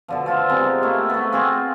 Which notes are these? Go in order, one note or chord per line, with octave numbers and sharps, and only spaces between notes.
B2 D3 F3
F3 F4 E5
C3 G#3 B3 D#4
A3 A#3 E4
A3 B3
C4 F4 F#4 G#4